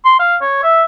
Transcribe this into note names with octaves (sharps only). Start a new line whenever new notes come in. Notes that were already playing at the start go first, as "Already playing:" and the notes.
C6
F5
C#5
E5